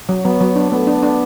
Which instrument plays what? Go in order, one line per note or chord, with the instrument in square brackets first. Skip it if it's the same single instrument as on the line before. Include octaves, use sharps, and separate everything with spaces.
[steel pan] F#3
[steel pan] F#3 [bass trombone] B3
[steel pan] F#3
D4
[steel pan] A3 [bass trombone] B3
[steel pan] D4
D4